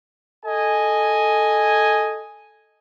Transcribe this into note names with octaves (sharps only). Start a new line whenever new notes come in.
A4 D#5 G#5